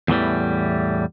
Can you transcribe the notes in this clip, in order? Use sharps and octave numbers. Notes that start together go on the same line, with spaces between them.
E2 A2 E3 G3